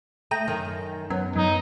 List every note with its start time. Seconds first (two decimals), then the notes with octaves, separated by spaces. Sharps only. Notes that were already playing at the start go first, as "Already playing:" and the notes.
0.31 A3 G5 A#5 D#6
0.48 F#2 D#3
1.10 F#2 B3
1.36 F#2 D#4